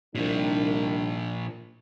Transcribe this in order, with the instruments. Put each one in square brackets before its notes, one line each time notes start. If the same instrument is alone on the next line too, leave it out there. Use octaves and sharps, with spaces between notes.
[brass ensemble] C2 D#3 [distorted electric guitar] A#2 F3 [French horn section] D4